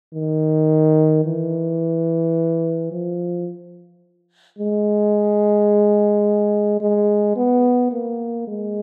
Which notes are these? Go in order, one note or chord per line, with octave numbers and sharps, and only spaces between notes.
D#3
E3
F3
G#3
G#3
B3
A#3
G#3